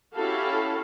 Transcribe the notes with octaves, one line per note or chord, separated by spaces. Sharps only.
C#4 E4 F#4 G4 A4 F5